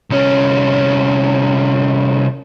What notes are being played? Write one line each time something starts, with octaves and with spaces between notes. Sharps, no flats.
C2 C#4